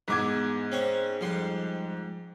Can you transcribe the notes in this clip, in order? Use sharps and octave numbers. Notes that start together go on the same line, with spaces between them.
E2 G#2 E3 D6 G#6
C4 C#4 C#6
F2 G3 C6